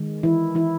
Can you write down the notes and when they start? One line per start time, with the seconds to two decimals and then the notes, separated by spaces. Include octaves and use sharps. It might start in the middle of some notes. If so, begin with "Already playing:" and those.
Already playing: D#3 G#3
0.23 E3 E4
0.55 E3 E4